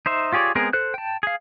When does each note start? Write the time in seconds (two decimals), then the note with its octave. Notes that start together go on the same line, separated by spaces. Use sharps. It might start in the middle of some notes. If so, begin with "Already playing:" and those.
0.06 D#4 C5 E5
0.33 F4 G4 G#4 C#5 D5
0.55 G#3 B3 C4 G#4 A#4
0.73 A4 C5 F#6
0.94 G5 A5
1.23 G#4 F5